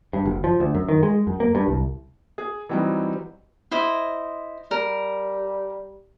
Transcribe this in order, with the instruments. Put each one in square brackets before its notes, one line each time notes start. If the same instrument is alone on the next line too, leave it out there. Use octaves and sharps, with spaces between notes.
[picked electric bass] G2
F#1
F3
D2
F#2
D#3
G#3
F#2
A#3
G2
C2
[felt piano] G#4
E3 F#3 G3 C4 D#4
[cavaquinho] E4 C5 D#5
[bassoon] G3 [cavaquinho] A#4